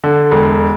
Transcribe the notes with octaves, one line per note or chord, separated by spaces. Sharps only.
D3
E1